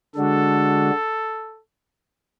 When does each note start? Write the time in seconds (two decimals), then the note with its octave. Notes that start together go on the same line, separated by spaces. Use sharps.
0.16 D3 G#3 D4 F#4 A4